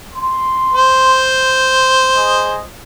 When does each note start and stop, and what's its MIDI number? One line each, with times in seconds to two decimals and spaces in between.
0.14 1.92 84
0.73 2.64 72
2.14 2.58 68
2.14 2.58 75